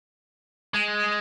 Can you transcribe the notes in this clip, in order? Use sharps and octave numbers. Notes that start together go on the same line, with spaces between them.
G#3